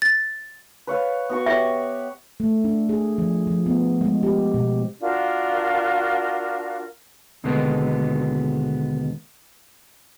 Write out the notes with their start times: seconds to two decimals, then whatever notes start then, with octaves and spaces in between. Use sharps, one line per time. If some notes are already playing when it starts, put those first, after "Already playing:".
0.02 A6
0.87 B4 C#5 F5
1.30 B3 F#4 C#6
1.46 G4 C#5 E5 F#5
2.40 A3
2.64 D4
2.89 G#4
3.18 F3
3.47 F3
3.66 B3
4.01 G#3
4.23 G4
4.54 B2
5.00 D4 F4 F#4 A#4
7.44 D#2 B2 D3 G#3 A#3 B3